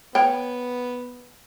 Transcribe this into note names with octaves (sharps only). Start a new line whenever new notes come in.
B3 C#5 G5